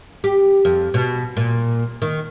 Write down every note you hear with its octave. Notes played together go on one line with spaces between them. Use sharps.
G4
F2
B2
A#2
D#3